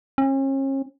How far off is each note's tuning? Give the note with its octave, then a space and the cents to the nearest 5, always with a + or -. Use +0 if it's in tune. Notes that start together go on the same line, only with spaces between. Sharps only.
C#4 -40